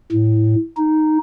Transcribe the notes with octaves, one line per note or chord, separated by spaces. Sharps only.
A2
D#4